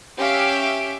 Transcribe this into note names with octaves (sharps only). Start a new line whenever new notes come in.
C#4 G4 E5 F5 D7